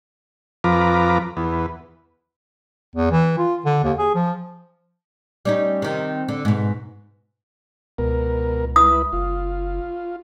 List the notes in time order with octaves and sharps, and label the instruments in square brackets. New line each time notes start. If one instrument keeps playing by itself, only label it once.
[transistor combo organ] F2 F3 B4 A#5 D6
E2 B3
[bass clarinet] E2
E3
F4
D3
D#2
G#4
F3
[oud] G3 C#4 D#4
C3 D#3
D3
G#2 B2
[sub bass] C#2 [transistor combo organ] B2 A#4
[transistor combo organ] E4 B4 [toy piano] D#6
[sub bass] F#1 [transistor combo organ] F4